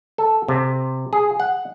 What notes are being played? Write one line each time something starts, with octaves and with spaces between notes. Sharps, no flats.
A4
C3
G#4
F#5